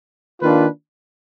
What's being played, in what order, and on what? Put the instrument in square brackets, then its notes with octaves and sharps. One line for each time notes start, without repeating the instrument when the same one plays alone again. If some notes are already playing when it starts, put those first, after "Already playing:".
[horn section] D#3 A#3 D4 F4 B4